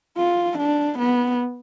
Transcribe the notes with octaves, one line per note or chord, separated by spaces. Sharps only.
F4
D4
B3